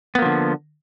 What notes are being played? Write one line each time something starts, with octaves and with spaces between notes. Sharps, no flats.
D3 F3 A#3 B3